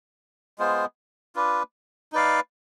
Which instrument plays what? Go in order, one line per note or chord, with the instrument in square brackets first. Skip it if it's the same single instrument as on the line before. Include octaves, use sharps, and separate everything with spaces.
[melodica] G#3 B3 F4 C5
D4 F4 B4
D#4 B4 D5 F5